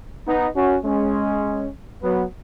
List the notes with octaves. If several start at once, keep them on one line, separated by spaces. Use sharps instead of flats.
B3 D#4
C#4 F#4
G#3 C#4
F#3 B3